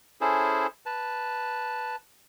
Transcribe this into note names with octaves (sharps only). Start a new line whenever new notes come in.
C#4 E4 G#4 A4 C5
B4 A5